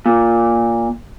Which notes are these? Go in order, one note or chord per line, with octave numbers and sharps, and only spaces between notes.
A#2